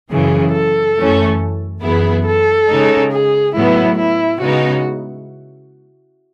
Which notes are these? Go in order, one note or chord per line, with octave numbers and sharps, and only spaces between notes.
F#2 C#3 E3 G#4
A4
F#2 E3 A3 C#4
F#2 E3 B3 E4 G#4
A4
C#3 G#3 D#4
G#4
A2 F#3 B3 E4
E4
C#3 G#3 B3 D#4 F#4